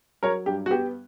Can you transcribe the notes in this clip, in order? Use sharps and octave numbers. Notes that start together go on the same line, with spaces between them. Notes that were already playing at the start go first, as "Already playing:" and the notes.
F#3 A#4 C#5
G2 G4
F#4
B3 G4